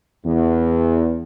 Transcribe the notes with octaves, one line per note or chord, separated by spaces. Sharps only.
E2